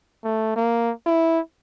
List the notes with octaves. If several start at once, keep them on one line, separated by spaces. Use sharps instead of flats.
A3
A#3
E4